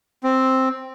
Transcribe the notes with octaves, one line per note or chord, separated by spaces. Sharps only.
C4